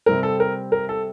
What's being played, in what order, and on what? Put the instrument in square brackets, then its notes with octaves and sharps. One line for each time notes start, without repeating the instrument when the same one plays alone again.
[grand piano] C3 G3 C4 A#4
A4
A#4
A#4
A4